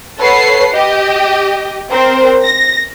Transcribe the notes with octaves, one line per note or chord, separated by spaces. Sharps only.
A4 B4 C#5 F#5 C7
G4 D#5
C4 A#4 C5
A#6